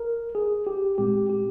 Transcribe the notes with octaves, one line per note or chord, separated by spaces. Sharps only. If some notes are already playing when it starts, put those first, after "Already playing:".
Already playing: A#4
G#4
G4
A#2 G#3 C4 G4
G4